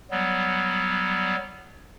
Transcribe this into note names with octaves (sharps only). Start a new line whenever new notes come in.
F#3 G3 B3